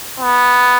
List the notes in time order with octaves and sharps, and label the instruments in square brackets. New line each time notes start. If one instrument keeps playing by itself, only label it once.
[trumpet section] B3